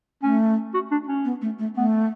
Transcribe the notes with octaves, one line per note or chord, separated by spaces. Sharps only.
A3 C#4
F#4
D4
C#4
B3
A3
A3
A3 B3